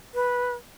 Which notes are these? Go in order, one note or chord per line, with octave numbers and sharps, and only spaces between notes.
B4